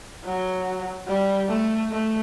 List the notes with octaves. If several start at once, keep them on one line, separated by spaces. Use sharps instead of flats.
F#3
G3
A3
A3